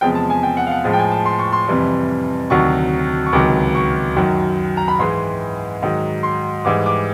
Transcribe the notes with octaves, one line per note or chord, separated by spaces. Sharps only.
E2 C3 F3 G#3 G5
A5
G#5
G5
F#5
F5
F#5
A2 F3 G#3
G5
G#5
A5
C6
C#6
C6
F2 C3 E3 G3
D2 C3 D#3 F#3 C#6
C#6
C#2 C3 D#3 F#3 D6
C#6
F#2 D#3 F#3
A#5
B5
G#2 E3 G#3 C6
G#2 D#3 F#3
C6
G#2 E3 G3 D6
D6